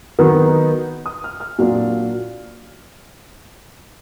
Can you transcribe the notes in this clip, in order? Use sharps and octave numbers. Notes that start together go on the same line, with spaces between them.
D#3 F#3 B3 D#4
D#6
F6
F6
A#2 F#3 D4 F4